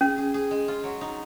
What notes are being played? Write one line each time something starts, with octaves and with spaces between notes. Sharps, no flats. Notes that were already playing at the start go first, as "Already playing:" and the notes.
C#4 G#4
G#4
G#4
G#3
F4
F#3
D#4